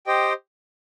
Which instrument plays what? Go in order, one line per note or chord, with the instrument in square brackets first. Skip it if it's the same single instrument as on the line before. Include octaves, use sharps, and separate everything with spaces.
[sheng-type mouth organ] G4 C5 D#5 G5